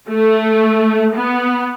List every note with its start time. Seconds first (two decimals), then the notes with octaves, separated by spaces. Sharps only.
0.10 A3
1.16 B3